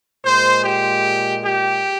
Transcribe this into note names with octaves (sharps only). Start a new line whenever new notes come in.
A#2 G#3 C5
G4
G4